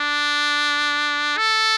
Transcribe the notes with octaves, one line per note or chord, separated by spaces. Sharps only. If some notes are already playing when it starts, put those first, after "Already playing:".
Already playing: D4
A4